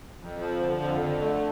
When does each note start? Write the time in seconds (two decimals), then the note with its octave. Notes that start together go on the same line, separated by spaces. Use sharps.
0.20 F2
0.40 F3
0.60 D3
0.81 F2
1.01 D3
1.21 A3